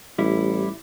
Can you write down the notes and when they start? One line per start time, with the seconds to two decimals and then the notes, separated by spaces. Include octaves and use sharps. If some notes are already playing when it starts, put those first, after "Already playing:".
0.18 A1 G3 E4